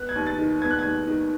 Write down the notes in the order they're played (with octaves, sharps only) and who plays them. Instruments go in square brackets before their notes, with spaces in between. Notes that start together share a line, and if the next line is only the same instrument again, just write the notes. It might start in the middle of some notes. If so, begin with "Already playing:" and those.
Already playing: [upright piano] B3 F#6
G#6
D#2
A6
D#3
B3 G#6
F#6
G#6
D#2
D#3